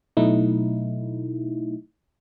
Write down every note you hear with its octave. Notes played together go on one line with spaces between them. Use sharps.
B2 F#3 A3 D#4 E4